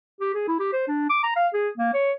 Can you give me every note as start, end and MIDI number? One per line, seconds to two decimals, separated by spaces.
0.21 0.32 67
0.35 0.43 68
0.48 0.58 64
0.59 0.70 67
0.73 0.86 72
0.88 1.09 62
1.10 1.24 86
1.24 1.34 82
1.36 1.47 77
1.54 1.69 68
1.78 1.91 58
1.94 2.12 73